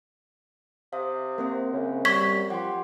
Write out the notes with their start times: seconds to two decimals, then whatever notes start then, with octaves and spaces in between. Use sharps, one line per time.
0.93 C3 F5 D#6
1.38 A#3 C4 A#4 C5
1.73 F#2 C#3
2.05 G3 C#6 G#6 B6
2.50 F3 G4 F#5 C6